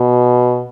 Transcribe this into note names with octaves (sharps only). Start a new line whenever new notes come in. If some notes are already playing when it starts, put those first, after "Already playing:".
Already playing: B2